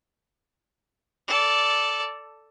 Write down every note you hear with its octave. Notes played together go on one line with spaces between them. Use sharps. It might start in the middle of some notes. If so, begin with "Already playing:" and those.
A4 D5